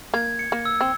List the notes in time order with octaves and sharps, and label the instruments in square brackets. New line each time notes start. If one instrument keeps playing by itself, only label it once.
[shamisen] A#3 [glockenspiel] G#6
[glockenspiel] C#7
[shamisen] A#3
[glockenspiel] E6
[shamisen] C4